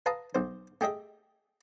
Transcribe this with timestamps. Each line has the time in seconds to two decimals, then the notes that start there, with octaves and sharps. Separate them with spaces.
0.06 B4 F5 A5 A#5 D#6
0.35 B1 C5
0.81 A3 G4 G#4 D#5 E5